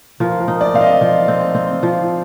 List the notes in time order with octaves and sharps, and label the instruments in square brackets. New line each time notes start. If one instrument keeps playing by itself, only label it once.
[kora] F3 [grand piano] A#4
[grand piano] A#4
[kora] D#4
[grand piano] D5
[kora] C4 [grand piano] F5
[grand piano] D#5
[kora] F3
C4
C4
F3